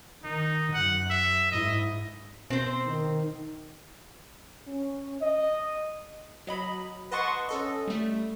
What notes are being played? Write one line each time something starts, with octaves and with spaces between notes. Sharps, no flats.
D#3 D#4
F#2 F#5
E5
G#2 E4 D#5
B2 C4 C5
D#3
C#4
D#5
F#3 D#5 B5
B4 D#5 F#5 A5 C6 C#6
C#4 A4 D#5
G3 A3